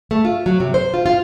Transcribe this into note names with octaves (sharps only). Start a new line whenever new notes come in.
A3
F4
F#3
C3
C5
F4
F4